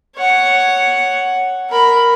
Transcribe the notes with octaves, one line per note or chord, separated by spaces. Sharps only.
C#5 F#5
A#4 B5